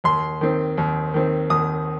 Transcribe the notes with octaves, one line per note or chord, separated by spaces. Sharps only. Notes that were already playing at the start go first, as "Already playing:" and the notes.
D#2 C6
D#3 C4
D#2
D#3 C4
D#2 D#6